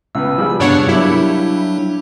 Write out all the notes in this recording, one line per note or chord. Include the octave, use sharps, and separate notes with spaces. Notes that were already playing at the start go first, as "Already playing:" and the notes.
C#2 B3 E6
F3 G3 G#4
G2 C3 B3 D4 C#5 F#5
F#3 G3 A#3 D4 E4 G4